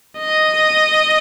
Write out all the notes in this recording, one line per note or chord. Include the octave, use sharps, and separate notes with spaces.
D#5